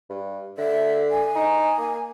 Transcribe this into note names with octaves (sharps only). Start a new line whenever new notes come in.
G2
D3 E5
G#5
D#4
A#3